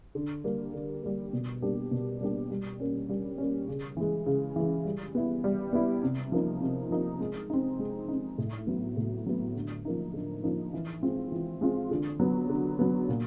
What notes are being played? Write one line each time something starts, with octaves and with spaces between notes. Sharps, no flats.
D3
G3 A#3
D3
G3 A#3
B2
G3 A#3 D4 G4
B2
G3 A#3 D4 G4
G3
A#3 C#4
G3
A#3 C#4
C#3
E3 G#3
C#3
E3 G#3
G3
B3 E4
G3
B3 E4
C3
F3 A#3 D#4
C3
F3 A#3 D#4
G#3
C4 D#4
G#3
C4 D#4
A2
F#3 B3
A2
F#3 B3
D3
F3 A#3 D#4
D3
F3 A#3 D#4
E3
G#3 C4 F4
E3
G#3 C4 F4
D3
F#3 B3
D3
F#3 B3
A#2